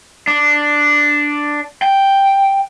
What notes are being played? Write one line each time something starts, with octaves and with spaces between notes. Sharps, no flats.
D4
G5